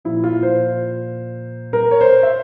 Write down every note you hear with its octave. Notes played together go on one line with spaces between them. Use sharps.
A#2 F3 E4
F4
C5
A#4
C#5
C5
E5